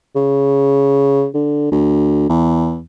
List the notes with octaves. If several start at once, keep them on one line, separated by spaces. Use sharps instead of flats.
C#3
D3
D2
E2